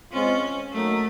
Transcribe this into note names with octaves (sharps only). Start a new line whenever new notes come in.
G#3 C4 C#4 F4
F#3 A3 A#3 D#4